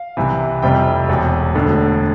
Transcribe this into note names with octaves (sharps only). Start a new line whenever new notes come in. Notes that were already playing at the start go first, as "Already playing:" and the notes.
Already playing: F5
C2 C3 E3
F1 F2 C3 G3 G5
E1 E2 B2
E1 D2 D3